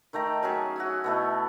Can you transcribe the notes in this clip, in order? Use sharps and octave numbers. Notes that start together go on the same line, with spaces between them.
D#3 A3 G5 A#5
F#3 C#4 G#4 A5
F#4 E5 G#5
B2 A3 E4